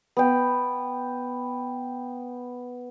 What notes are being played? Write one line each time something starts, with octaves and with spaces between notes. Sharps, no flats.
B3 G5